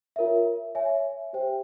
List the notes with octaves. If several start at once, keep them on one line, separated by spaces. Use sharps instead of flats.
F4 A#4 C#5 E5
C#5 E5 G#5
G4 C5 E5 G5